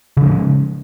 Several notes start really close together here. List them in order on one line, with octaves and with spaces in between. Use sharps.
C#3 F3 G#3 C#4